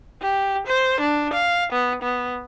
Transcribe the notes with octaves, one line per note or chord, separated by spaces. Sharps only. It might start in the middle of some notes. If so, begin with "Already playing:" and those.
G4
C5
D4
F5
B3
B3